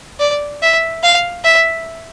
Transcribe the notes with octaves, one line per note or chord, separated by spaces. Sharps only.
D5
E5
F5
E5